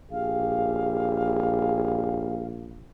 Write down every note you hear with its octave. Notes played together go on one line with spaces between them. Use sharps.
A#1 G4 G#4 F5